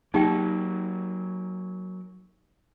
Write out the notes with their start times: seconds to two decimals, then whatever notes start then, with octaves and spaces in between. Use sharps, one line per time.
0.14 F#3 A#3 D#4 G4 G5